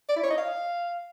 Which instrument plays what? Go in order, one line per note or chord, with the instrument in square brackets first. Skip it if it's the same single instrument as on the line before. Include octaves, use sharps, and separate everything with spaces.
[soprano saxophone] D5
E4
C#5
D#5
F5